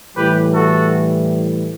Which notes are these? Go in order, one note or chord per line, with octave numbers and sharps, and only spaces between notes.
A2 E3 G3 G4 B4
F#4 A4